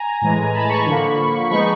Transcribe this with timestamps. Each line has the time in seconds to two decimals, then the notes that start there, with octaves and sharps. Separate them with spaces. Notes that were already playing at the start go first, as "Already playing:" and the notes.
Already playing: G#5 A#5
0.21 A2 E3 G#3
0.54 A5 B5
0.69 B5 C#6
0.86 D3 F3 A#3
1.50 F3 G#3 B3 D#4 B5 C#6